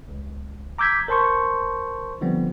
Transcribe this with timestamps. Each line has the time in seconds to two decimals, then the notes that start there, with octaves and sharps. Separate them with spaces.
0.09 C#2
0.78 A#5 D6 E6 G6 G#6 B6
1.08 A#4 C5 A5 C6 C#6 G6
2.21 D3 F3 G3 B3 C4